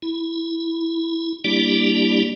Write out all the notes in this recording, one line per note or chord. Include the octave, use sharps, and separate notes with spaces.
E4
G3 A#3 D4 E4 G4 D5